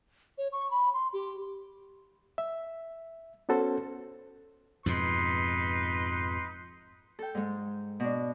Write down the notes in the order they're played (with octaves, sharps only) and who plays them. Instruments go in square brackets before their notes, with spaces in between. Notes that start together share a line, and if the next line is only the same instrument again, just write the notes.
[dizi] C#5
C#6
B5
C6
G4
[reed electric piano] E5
B3 C#4 F#4 A4 C5
[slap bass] F2 G#2 B2 [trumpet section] D#4 B4 C6
[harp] A4 G5
G#2 G#3
B2 D4